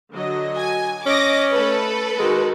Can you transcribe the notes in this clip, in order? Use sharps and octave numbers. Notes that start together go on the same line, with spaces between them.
D3 F#3 D#5
G#5
C#4 D#5 D6 A#6
A3 A4 B4
D#3 G#3 F#4